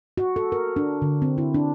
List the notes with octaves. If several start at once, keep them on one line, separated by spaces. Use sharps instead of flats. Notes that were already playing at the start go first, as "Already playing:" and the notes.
F#4
A4
A#4
D4
D3
C4
E4
D4